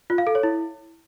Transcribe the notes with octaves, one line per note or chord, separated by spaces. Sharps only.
F4
F5
A4
C#5
E4